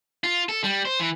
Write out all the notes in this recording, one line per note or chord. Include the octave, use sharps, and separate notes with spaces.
F4
A4
G3
C5
E3